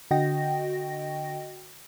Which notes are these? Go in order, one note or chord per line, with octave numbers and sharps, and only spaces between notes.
D3 F#4 D#5 G5 A#6